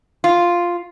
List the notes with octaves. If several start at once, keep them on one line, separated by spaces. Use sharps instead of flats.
F4